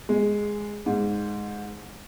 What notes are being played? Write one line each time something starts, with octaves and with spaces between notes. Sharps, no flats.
G#3
G#2